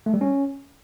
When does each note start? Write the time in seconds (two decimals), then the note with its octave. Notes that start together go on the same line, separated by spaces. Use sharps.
0.06 A3
0.14 G3
0.21 C#4